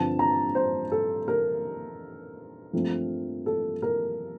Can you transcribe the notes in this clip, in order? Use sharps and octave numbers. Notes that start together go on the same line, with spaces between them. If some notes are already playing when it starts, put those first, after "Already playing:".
Already playing: G2 D3 F3 C4 A5
A#5
C5
A4
A#4
G2 F3 A3 C4
A4
A#4